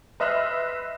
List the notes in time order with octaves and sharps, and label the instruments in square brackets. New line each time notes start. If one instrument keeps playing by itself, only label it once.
[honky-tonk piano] B4 D#5 E5 C6 F6 F#6